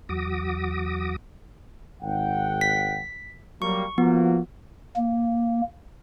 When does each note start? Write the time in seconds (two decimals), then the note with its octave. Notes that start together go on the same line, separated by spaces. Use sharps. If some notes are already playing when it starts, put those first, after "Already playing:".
0.09 E2 F#3 F#4 D6 D#6 A#6
2.03 G#1 F#5 G5
2.61 B6
3.62 F#3 G3 A#3 C#6
3.98 F3 A#3 B3 F#4
4.96 A#3